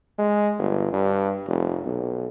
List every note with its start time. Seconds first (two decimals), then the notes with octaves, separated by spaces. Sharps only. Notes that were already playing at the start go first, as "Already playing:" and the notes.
0.18 G#3
0.58 G1
0.93 G2
1.48 F1
1.84 B1